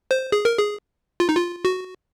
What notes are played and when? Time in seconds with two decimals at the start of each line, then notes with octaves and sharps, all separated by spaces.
0.11 C5
0.32 G#4
0.45 A#4
0.58 G#4
1.20 F4
1.29 D#4
1.36 F4
1.65 F#4